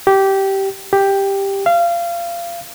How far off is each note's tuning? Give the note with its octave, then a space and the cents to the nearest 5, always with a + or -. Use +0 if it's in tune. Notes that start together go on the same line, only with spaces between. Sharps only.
G4 -15
G4 +5
F5 -25